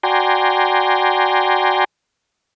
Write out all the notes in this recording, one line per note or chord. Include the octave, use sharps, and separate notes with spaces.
F#4 D5 G5 G#5 A#5 C6